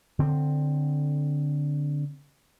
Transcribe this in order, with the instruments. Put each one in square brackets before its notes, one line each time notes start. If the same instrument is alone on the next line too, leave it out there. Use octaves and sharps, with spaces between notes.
[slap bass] D3 C4